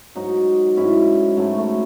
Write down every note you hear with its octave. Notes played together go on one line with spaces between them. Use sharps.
G#2 F#3 D#4 F#4
G#2 F#3 C#4 E4
G#2 F#3 A3 C#4
A3